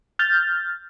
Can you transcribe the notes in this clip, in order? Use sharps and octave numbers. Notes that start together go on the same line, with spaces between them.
F6 G6 A6